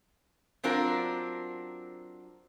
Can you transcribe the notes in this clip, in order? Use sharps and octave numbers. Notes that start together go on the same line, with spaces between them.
F#3 C4 D4 F4 A#4